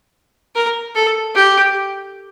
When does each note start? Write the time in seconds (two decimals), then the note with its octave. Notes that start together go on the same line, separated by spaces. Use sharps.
0.55 A#4
0.95 A4
1.35 G4